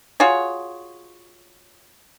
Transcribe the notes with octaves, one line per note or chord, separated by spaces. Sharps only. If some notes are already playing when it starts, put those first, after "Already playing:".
F4 F#4 G#4 C#5